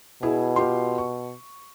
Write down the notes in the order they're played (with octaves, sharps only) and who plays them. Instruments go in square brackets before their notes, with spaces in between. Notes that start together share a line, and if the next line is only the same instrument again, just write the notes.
[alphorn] B2 [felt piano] E4 G#4
[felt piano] F4 G4 C6
C#6